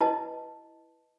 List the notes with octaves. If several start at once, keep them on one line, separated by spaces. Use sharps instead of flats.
E4 B4 D#5 A5